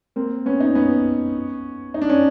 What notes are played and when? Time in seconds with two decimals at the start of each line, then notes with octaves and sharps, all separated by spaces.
0.16 A#3 C4
0.46 B3 C#4
0.60 C#4 D#4
0.75 B3 C#4
1.94 D#4
2.02 D4
2.10 C#4